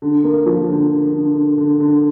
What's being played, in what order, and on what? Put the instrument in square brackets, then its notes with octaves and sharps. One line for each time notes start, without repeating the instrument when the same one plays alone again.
[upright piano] D3
A#3
F3
D3
D3
D3
D3
D3
D3